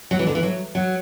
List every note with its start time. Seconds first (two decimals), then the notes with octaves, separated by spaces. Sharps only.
0.11 F#3
0.19 E3
0.27 D3
0.35 E3
0.43 F#3
0.75 F#3